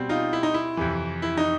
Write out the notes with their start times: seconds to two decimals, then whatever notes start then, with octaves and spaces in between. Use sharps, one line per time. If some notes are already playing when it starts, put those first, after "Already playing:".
Already playing: B2 G3 C4
0.09 D#4 F4
0.33 E4
0.43 D#4
0.54 E4
0.77 F2 C3 E3
1.22 E4
1.37 D#4